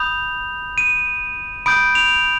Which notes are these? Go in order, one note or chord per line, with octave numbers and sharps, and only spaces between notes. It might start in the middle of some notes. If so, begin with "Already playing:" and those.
Already playing: B5 D#6 G6 F7
D#7
B5 D#6 G6 D7
F7